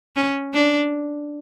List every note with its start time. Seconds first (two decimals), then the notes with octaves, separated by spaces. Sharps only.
0.16 C#4
0.54 D4